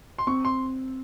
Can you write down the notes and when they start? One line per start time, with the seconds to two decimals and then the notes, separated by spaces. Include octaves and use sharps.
0.18 C6
0.27 C4 C#6
0.45 C6